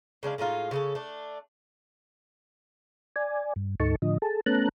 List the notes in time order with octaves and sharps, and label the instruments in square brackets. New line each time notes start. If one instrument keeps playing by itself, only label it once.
[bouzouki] C#3 G#3 D4 F5
A2 G#3 D#4 F4
C#3 C#4 A4
A3 D4
[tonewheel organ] D5 G#5
G2
D2 G#2 D#4 A4 A5 C#6
A2 D3 F3 D#5
G#4 A4 A5
A3 B3 C#4 A5 A#5 F#6